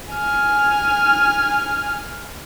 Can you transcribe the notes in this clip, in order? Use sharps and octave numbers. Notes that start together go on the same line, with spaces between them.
G#5 F6